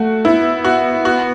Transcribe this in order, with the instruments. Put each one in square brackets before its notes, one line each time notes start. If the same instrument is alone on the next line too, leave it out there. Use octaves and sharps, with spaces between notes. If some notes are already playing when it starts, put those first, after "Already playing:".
Already playing: [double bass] A3 [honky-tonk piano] F#4
[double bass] B3 [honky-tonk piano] E4
[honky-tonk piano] F#4
F#4